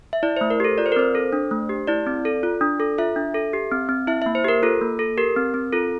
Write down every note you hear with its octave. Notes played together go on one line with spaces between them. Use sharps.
E5
E4 D5
A3 C5
A#4
G4 A4
F4 D5
C5
A#4
C4 C5
A4
D4
A3
G4
E4 D5
C4
A4
F4
D4
A4
F4 E5
D4
A4
G4
C4
C4
E4 E5
A#3 E5
C5
G4 A#4
F4 A4
A#3
A4
G4 A#4
C4
C4
F4 A4